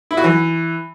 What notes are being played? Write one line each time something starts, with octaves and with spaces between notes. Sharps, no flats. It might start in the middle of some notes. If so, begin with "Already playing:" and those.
E4
F#4
E3